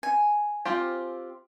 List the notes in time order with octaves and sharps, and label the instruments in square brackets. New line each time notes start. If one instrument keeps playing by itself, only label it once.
[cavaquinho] G#5
[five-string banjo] C4 F4 G4